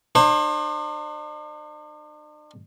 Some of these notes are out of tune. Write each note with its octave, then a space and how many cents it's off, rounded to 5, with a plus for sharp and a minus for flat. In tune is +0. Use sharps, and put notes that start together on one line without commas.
D4 +45 C5 +35